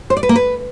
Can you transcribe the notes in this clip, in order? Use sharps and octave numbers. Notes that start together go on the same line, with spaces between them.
C5
D5
B4
A#3
B4